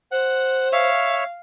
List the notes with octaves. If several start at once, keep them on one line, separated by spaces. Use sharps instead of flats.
C5 F#5
C#5 E5 F5